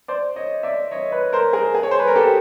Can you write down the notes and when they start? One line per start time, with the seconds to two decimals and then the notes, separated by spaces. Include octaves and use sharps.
0.08 C5 D5
0.36 C#5 D#5
0.63 D5 E5
0.91 C#5 D#5
1.12 B4 C#5
1.33 A#4 C5
1.53 G#4 A#4
1.75 G#4
1.83 C#5
1.91 C5
2.00 B4
2.07 A#4
2.16 G4 A4